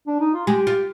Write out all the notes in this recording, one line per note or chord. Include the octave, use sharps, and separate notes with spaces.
D4
D#4
F4
G#3 G4
F4